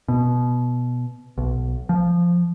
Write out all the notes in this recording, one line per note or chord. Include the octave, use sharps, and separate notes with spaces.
B2
B1
F3